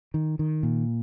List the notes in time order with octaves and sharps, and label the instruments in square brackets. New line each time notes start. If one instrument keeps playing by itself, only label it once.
[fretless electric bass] D#3
D#3
A#2